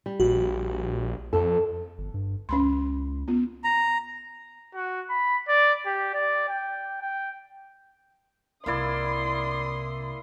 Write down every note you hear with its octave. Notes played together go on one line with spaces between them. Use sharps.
G3
A#1 F#4
F2 A4
G1
G2
C#2 C#4 B5 C6
B3 F4
A#5
F#4
B5
D5
G4
D5
G5
G5
C2 C3 A#3 E4 D5 C6 D#6